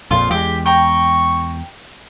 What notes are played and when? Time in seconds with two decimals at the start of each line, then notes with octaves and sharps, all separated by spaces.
0.11 A#1 F2 A#2 F4
0.31 E2 G#3 G4
0.66 G5 A#5 C#6